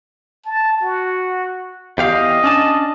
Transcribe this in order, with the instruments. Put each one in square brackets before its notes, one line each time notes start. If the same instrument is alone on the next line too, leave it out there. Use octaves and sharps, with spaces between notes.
[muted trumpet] A5
F#4
[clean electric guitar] E2 G4 F5 [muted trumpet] D#5
[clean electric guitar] C#4 D4 A5